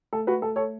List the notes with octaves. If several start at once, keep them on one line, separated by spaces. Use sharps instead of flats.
A3 A4
F#4 B4
A3 A4
A4 C#5